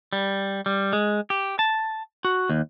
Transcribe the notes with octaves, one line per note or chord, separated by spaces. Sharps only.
G3
G3
G#3
G4
A5
F#4
D#2